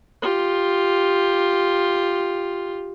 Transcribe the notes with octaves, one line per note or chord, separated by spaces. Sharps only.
F4 G4